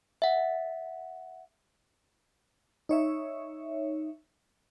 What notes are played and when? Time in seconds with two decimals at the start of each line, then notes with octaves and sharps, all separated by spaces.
0.22 E5 F#5
2.89 D#4 C#5 E5